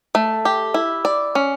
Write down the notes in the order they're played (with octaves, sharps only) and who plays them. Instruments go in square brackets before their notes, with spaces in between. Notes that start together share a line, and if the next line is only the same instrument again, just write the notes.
[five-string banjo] A3
G4
E4
D5
C#4